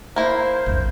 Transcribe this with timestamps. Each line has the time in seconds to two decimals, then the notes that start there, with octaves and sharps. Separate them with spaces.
0.16 A#3 E4 C5
0.66 A#1 F2